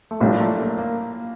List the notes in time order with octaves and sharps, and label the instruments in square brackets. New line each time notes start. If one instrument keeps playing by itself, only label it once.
[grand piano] A3
[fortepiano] A#1 A2 G3 D4 [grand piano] A#3
[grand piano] A3
A#3
A#3